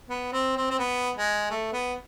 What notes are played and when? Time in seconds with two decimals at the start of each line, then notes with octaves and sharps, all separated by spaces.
0.10 B3
0.33 C4
0.57 C4
0.71 C4
0.79 B3
1.15 G#3
1.50 A3
1.73 B3